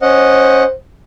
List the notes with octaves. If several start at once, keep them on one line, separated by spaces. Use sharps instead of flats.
C#4 C5 D#5 F#5